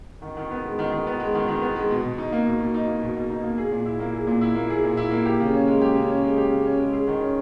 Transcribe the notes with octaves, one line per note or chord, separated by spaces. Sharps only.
D#3
D#3
B3
G#3
D#3
D#3
B3
G#3
D#3
D#3
B3
G#3
B2
B2
D#4
A#3
B2
B2
D#4
A#3
B2
B2
D#4
A#3
G#4
A#2
E4
A#3
G#4
A#2
E4
A#3
G#4
A#2
E4
A#3
G4
C#3
C#4
G#3
G4
C#3
C#4
G#3
G4
C#3
C#4
G#3
G#4
D#3
C#4